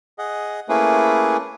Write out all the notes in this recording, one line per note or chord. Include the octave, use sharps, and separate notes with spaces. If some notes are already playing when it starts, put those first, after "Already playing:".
G#4 D#5 F#5
A3 A#3 C#4 E4 G#4 B4